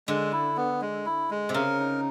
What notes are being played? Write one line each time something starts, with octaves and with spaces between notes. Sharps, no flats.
D3 G#3
E4
B3
G#3
E4
G#3
C3
C#3 A#4
D#4